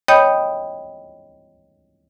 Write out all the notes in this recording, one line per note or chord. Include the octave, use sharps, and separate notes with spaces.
C#5 D#5 G5 B5 D#6 G6